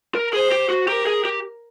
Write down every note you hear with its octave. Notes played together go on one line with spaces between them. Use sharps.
A#4
G#4 C5
G4
F#4
G4 A#4
G#4
G4